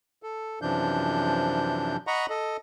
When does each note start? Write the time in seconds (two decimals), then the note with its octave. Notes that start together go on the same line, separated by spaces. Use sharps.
0.23 A4
0.62 F#2 C3 E3 F3 D4 G6
2.07 D#5 F#5 A#5 B5 C#6
2.30 A4 D#5